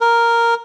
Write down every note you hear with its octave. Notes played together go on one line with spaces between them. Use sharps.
A#4